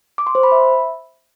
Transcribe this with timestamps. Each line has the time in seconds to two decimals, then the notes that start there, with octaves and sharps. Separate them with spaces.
0.18 D6
0.27 C6
0.35 C5
0.43 B5
0.52 E5